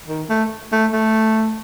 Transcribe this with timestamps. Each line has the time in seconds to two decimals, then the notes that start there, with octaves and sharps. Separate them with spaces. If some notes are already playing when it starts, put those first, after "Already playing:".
0.08 D#3
0.29 A3
0.72 A3
0.93 A3